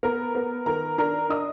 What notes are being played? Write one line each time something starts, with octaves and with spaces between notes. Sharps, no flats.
B3 A#4 A#5
B3
D#3 A#4 A#5
D4 A#4 A#5
D4 D#5 D#6